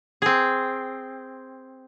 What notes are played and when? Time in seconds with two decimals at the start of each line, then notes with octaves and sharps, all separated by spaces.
0.22 C4 G#4